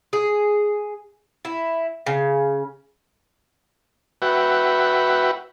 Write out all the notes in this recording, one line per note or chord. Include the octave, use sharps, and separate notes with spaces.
G#4
E4
C#3
F#4 B4 E5 F#5 G5